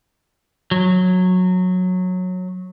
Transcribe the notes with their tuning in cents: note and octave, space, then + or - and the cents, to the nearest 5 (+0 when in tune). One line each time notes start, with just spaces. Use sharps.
F#3 -15